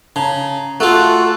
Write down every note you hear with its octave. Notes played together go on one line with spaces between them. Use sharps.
C#3 A5 A#5
A3 F4 F#4 G#4 A4 A5 F#6